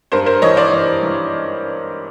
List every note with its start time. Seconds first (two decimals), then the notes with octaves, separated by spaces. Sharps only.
0.12 G2 A#4 C5
0.26 A#4 C5
0.42 E3 C#5 D#5
0.57 C5 D5
0.72 E3
1.02 E3